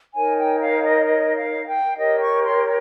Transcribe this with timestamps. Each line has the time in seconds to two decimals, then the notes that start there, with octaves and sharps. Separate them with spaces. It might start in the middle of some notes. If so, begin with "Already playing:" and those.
0.15 D#4 A#4 C#5 G#5
0.38 G5
0.60 F5
0.83 D#5
1.06 D#5
1.36 F5
1.67 G5
1.97 G4 A#4 C#5 D#5
2.21 C#6
2.43 C6